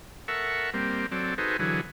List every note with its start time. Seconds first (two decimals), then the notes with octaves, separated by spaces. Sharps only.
0.28 A4 A#4 E5 F#5 C#6
0.74 G3 A#3 C4
1.12 F#3 C4 A4 D5
1.38 D#4 F#4 G#4 A4 B4 C5
1.59 D3 E3 F#3 G#4